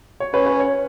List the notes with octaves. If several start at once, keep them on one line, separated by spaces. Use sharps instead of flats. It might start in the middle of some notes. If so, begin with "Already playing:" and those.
C#5
C#4 B4
B4
C#5